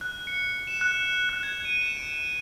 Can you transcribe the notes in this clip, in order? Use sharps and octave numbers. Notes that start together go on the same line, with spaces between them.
F#6
C#7
E7
F#6
F#6
G#6
D#7
E7
D7